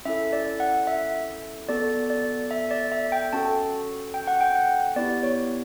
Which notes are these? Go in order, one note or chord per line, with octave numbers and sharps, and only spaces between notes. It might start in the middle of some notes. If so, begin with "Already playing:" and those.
C#4 E4 A4 E5
D5
F#5
E5
B3 F#4 A4 D5
D5
E5
D5
E5
G5
C#4 F#4 A4 A5
G5
F#5
G5
F#5
B3 E4 G4 D5
C#5